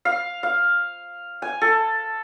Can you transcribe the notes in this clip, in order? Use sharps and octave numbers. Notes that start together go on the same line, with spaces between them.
F5
F5
G#5
A4